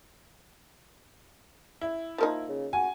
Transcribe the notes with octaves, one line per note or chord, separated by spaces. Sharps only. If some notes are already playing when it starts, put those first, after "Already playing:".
E4
F3 A#3 D#4
C#3
F#4 G#5